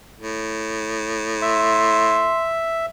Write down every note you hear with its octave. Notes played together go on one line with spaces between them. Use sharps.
A2
E5 C6